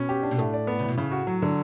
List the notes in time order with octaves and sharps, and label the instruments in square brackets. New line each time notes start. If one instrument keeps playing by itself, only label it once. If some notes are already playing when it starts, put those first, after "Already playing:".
Already playing: [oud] B2 [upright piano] C#4
[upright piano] G4
D4
[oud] B2
[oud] A2 [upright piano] A3
[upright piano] D5
B3
[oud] C#3 [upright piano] E3
[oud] B2
[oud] A2 [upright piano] C#3
[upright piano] F#4
F#3
D3